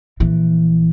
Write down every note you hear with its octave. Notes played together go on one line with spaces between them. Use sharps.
A#1 E3